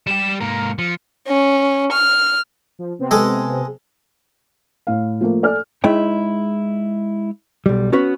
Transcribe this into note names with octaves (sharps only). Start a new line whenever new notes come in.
G3 G4 E7
G#2 A#3 A#5
F3 C#7
C#4
F6
F3
C3 B3 C4
G#3 A4
A2 F5
F3 A3 A#3
A4 D5 G#5 F6
G#3 D#4 E4 C#5 G5
B1 G3
B3 C#4 F#4 B4